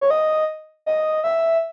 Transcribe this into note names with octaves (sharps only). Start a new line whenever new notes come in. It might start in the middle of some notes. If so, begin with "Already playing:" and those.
C#5
D#5
D#5
E5